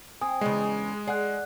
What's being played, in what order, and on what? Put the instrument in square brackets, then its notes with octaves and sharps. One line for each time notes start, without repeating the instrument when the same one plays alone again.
[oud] C4 [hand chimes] G#5 D#6
[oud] E2 C#3 [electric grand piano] G#3
[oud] G#4 [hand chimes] D5 F#5 F#6